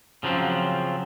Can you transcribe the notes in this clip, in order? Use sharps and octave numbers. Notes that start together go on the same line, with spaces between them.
C#3 F3 F#3 C4